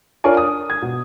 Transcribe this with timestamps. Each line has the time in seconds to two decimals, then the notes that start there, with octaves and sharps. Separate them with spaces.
0.24 D4 F4 A#4 C#5 D5 G#5
0.37 D#6
0.70 G#6
0.82 B2